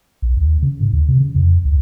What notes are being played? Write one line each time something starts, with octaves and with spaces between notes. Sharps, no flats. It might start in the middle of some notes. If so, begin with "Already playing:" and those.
B1
D#2
C#3
G#2
D#2
C3
C#3
F2
C#2